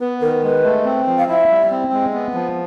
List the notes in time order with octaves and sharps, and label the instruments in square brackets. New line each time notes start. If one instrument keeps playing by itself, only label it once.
[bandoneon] B3 [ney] B4
[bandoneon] D#3 [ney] A#4
[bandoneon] G#3 [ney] B4
[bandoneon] A3
C4
F3
[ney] F5
[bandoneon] E4 [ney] E5
[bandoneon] G3
C4
G#3
B3
F3